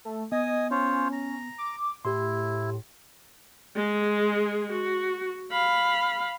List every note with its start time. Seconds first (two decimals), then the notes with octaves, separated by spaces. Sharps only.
0.05 A3
0.32 B3 D#5 G#5 D#6
0.71 C#4 F4 C5 C#5
1.12 A#5
1.58 D6
2.05 A2 E4 G4 C6
3.76 G#3 G#4
4.72 F#4
5.51 F5 B5